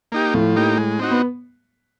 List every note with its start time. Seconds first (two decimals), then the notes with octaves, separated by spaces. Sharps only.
0.12 A#3 D#4 G4
0.34 A2 F3 A3
0.56 A#3 D#4 G4
0.78 G#3
0.99 C4 D#4 F#4
1.11 B3